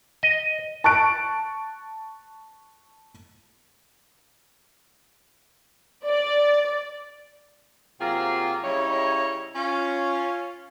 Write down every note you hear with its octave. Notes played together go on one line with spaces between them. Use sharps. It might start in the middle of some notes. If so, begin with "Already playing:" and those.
D#5
A5 C#6 F#6 D7
D5
C3 F#3 A#3 C4 F4 G#4
C#3 G3 D#4 E4 C#5
C#4 F4